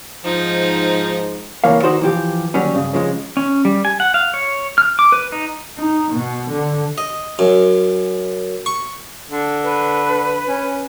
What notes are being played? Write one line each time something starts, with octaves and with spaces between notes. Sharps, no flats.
G#2 F3 D#4
C2 E3 A#3 C#5 F5
D#3 D#4 F#4 C5 D5
E3 F3 G4
D#2 D3 F#3 G3 C#4
G2 C#3
C#3 F3 G#3
C#4
G3
G#5
F#5
F5
C#5
F6
D6
B4
D#4
D#4
B2
D3
D#5
F#2
C#6
D3
B4
C#4